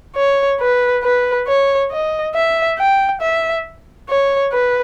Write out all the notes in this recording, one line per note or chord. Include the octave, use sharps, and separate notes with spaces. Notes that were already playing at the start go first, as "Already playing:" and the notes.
C#5
B4
B4
C#5
D#5
E5
G5
E5
C#5
B4